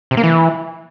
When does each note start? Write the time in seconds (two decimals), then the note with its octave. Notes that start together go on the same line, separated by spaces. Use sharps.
0.11 C3
0.17 A#3
0.23 E3